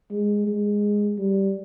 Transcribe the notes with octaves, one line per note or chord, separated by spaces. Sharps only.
G#3
G#3
G3